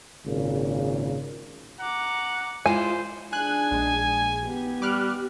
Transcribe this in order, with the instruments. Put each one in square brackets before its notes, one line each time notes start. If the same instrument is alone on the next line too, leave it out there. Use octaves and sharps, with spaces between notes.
[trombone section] G#1 A#2 C#3
[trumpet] F#5 [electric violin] A#5 D6
[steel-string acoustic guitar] G#3 E4 [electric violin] F4 [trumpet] C5 [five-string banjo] G#5
[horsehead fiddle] D4 G#4 [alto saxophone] G#5 [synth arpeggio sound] F#6
[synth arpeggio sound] A#1 G#3
[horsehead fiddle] B3 G4
[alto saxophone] G3 [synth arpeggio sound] D6 F6 F#6